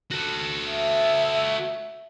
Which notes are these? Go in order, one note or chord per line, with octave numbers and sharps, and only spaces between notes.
F#4 A4
E5